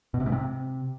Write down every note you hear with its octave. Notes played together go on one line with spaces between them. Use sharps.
B2
C3
G#2
C3